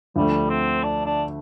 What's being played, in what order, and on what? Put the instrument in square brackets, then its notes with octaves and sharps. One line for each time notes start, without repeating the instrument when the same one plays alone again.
[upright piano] D2 D3 F3 A3 [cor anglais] G3
[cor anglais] C4
D4
D4